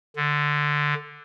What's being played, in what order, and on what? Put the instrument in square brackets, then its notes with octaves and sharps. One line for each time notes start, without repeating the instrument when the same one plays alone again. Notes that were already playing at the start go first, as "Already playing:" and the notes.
[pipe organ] D3